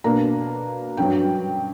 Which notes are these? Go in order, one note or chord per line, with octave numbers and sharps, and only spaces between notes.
B2 A#3 D4 A#5
G2 F#3 C#4 G5